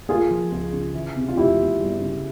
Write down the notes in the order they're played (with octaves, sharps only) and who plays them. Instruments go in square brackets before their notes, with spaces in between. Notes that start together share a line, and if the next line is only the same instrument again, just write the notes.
[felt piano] A#3 [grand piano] F4 G#4
[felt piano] F3
C#2
C#3
E3
C3
[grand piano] F4
[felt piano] F1 [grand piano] E4 G4
[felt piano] E2
G1
C#3